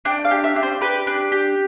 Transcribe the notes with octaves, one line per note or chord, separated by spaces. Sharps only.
D4 G5
F5
G4
E5
D4
C5
G4 B4
D4
G4